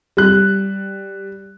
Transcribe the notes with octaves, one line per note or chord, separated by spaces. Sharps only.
G3 F#6